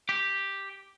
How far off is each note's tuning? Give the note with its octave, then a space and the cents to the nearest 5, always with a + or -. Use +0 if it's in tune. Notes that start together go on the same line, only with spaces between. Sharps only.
G4 +0